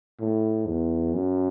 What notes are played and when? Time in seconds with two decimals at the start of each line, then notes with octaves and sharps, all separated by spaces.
0.20 A2
0.67 E2
1.14 F#2